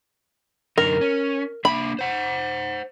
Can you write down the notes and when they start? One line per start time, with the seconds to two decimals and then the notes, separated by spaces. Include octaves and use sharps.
0.78 F#2 D3 D#4 A#4
1.01 C#4
1.65 A#3 D4 E5 B5
1.99 C5 F#5